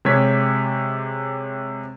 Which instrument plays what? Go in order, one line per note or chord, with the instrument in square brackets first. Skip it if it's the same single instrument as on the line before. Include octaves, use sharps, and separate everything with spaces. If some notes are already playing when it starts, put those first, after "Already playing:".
[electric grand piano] C3 G#3 G4 C#5 G#6 B6